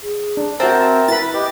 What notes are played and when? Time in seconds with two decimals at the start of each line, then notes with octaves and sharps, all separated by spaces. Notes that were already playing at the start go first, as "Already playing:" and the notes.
0.02 G#4
0.37 D4
0.60 C4 F#4 A#4 E5 A5
0.80 A5
1.08 E4 B4 B5 A6
1.34 G4 B4 D#5